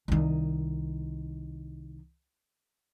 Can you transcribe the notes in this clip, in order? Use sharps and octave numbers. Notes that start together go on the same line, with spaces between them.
C2 D#3